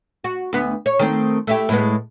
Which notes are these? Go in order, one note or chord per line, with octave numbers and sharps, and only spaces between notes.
F#4
D2 B3
C#5
D#3 A3 C4
A3 E4 G4
A2 G#3 B3